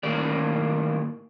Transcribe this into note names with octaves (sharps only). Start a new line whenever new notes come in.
A2 D#3 A#3 G4 D5